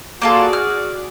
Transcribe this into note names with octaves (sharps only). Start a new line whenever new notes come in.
A#3 F4 F#4 G#4 A4 D5
F6